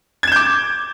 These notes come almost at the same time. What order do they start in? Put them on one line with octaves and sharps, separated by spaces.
G#6 E7 G6 D6